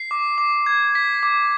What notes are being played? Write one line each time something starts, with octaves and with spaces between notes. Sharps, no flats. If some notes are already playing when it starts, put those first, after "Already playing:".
Already playing: C7
D6
D6
G#6
B6
D6